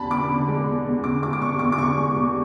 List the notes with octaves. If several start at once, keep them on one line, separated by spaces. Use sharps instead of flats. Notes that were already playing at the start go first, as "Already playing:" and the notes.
Already playing: E2 D3 A5 B5
E2 D6
D3
G#3
E2
E2
D3 D6
G#3 D6
D6
E2 C#6
E2 D6
D6
D3 C#6
G#3
E2